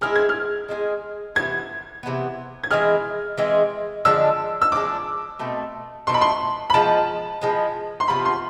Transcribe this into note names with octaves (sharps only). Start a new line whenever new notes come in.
G#3 C4 E4 G#4 F6
G#6
F6
G#3 C4 E4 G#4
C3 E3 B3 G#6
C3 E3 B3
G#6
E3 G#3 C4 G#4 F6
E3 G#3 C4 G#4
D3 F3 G#3 D4 E6
E6
D3 F3 G#3 D4 D6
B2 A3 C4
B2 A3 C4 C6
B5
C6
B5
F3 G#3 B3 A5
F3 G#3 B3
C6
C3 F3 B3 F4 B5
C6